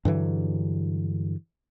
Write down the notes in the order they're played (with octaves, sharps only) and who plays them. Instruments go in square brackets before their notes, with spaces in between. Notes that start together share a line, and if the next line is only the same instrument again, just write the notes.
[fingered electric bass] G2 D3 E3 F#3